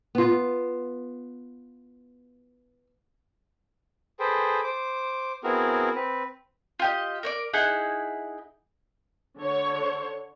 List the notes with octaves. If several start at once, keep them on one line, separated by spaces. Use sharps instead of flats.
B3 F4
G#4 A4 B4 C5 G5
C5 D6
B3 C4 E4 F#4 G#4 A#4
C4 B4
F4 G4 D#5
A#4 C#5 D5
D#4 E4 G#4 F#5
D3 C#5